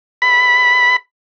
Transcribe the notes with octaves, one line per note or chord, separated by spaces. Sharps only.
B5